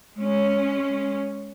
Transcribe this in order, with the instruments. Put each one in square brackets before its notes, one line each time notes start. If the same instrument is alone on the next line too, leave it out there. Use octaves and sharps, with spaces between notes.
[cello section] G#3 C#4